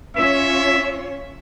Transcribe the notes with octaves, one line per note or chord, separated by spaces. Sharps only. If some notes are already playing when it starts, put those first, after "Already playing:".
C#4 F4 C#5 E5